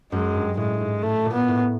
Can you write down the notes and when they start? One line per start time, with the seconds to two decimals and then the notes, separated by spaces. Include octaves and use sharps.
0.12 F#2 G#3
0.35 G2
0.57 A2 G#3
0.80 G#2
1.02 A2 A3
1.26 A#2
1.33 B3
1.48 A2